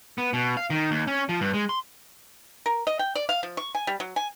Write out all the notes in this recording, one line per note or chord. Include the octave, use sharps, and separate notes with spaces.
B3
B2
F5
D#3
D#2
C#4
F3
G2
G#3
C6
A#4
D#5
G5
D5
F5
F3
C#6
G#5
G3
F#3
G#5